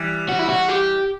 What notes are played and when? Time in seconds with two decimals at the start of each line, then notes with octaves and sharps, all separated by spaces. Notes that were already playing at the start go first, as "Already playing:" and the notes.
Already playing: E3 G3
0.29 F#4
0.39 E4
0.49 F#4
0.68 G4